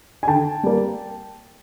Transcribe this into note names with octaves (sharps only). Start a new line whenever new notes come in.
G#5
D3 G5 A5
G3 A#3